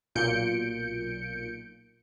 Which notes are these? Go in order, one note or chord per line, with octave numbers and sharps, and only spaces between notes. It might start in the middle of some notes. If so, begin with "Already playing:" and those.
B1 A#2 G6 C#7 D7